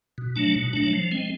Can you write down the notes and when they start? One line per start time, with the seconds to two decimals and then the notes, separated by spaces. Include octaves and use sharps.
0.18 B2
0.36 F#3 A3 D4
0.56 B2
0.73 F#3 A3 D4
0.93 F3
1.11 G#3 C4